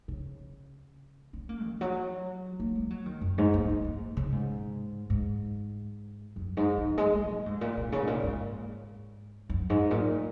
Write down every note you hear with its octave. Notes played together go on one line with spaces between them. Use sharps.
C#3
C#4
A#3
D#3
F#3
A#3
G#3
F#3
D#3
F#2
G#2
A#3
A#3
G#3
C#3
G#2
G#2
F#2
G#2
D#3
G#3
G#3
A#2
G#2
A#2
A#2
C#3
G#2
A#2
G#2
F#2
G#2
A#2